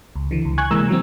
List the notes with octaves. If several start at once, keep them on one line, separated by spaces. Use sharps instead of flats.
C#2
D3 E3
C#2
G#5 C#6 F#6 G#6
C3 E3 G#3 A#3 A#5 E6
E3 F#3 C4